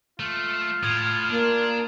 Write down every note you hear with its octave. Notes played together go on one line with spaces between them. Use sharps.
A3 F4
A2 D#6 G#6 D#7
A#3 D4